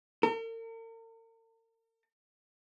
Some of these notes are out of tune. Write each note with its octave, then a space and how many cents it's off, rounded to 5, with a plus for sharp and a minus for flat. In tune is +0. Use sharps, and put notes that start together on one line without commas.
A#4 -45